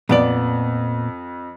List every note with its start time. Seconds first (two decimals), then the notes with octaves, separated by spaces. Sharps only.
0.09 F2 A#2 B3 D5 F#7